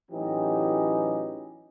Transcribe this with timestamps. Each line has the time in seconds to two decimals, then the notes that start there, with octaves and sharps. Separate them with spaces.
0.10 A2 E3 F#3 C#4 D#4 G4